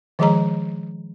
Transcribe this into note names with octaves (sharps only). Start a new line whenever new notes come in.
D#3 F3 G#3 G#4 D#5 A#5